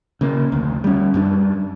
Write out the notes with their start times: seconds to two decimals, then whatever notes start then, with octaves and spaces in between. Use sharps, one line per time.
0.21 C#3 A#3
0.52 F1 D2
0.84 G3 C#4
1.14 F#2 G3 D4